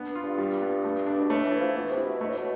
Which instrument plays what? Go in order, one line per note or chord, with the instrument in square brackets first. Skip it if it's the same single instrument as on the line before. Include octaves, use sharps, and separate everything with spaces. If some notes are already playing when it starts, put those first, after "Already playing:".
Already playing: [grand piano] B3 D4
F4
[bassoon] G2
[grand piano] G3
B3
A3
D4
[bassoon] B2
[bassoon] A2 [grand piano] A3
[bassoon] E3
[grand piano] E4
[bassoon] F3
[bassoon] E3 [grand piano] B3
[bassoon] C3
[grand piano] E4
[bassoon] B2
[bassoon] B2 [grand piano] A3
[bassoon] A2
B2